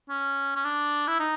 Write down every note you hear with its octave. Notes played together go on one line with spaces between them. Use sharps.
C#4
C#4
D4
E4
D#4